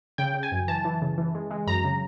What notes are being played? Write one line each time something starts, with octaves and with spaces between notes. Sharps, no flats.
C#3 G5
C#3
G#5
F#2
E3 A5
E3
C#3
E3
G#3
G#3
F#2 A#5
C#3